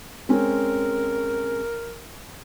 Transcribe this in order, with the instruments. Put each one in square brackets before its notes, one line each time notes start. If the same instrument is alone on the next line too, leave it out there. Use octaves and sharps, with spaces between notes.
[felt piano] G#3 C4 C#4 [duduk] A#4